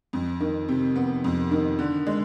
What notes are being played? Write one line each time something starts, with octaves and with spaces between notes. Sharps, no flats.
F2
D#3
C3
B3
F2
D#3
D3
G#3